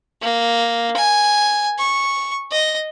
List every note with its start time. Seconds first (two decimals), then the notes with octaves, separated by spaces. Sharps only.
0.22 A#3
0.96 G#5
1.78 C#6
2.51 D#5